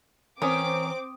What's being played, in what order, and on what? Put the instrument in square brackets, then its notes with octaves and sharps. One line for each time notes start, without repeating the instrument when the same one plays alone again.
[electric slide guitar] E3 A#5 [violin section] C4 D6 [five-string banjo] C#4 A#4 [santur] D#6